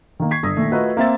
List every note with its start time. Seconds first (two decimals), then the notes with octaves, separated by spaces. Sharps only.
0.20 D#3 A#3
0.31 C#6 G#6 B6 C7
0.43 G1 D#6 E6 A#6
0.57 A#2 D#3 A3
0.71 A3 F4 F#4 A#4 B4 D#5
0.97 A#3 C4 E5 A6